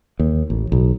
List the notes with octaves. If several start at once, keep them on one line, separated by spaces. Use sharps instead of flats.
D#2
A1
B1